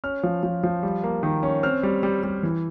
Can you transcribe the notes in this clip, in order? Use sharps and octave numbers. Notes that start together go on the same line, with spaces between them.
C#4 F6
F3
F3
F3
G3
A#3
D#3
C#4
C4 F6
G3
G3
G3
E3